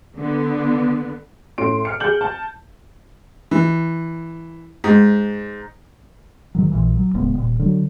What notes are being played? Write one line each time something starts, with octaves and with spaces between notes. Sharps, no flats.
D3 B3
A2 C#4 C6 D7
F6 C#7
G#4 G6 F#7
A5
E3
G#2
G#2 D#3 F#3
A#1 A#2 E3
F#3
D#1 C#2 A2 B3
D#1 A#2
D3 F#3